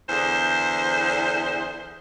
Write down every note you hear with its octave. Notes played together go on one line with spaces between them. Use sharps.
E2 D3 G#4 C5